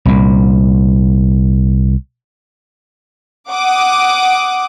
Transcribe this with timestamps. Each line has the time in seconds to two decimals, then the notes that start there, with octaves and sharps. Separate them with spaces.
0.06 C2 A#2
3.50 F#5 D6 D#6